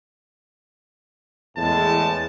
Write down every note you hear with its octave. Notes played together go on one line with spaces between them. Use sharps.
E2 A2 G#3 A5